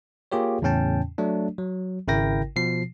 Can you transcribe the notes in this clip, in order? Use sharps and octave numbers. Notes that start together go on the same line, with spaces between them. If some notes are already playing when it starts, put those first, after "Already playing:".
A#3 F4 G4 G#4 C#5
E2 A2 C#3 C#4 G5 A5
F#3 A3 D4
F#3
G#1 C#3 E4 A#4 G5 A#6
B2 F3 C7